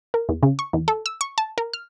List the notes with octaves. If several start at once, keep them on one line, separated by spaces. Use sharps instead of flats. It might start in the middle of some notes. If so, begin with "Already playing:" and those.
A#4
E2
C#3
C#6
E2
A4
E6
C#6
A5
A#4
F6